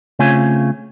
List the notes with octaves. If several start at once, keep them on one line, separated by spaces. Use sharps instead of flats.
C#3 A3 C4 F4 C#5 G#5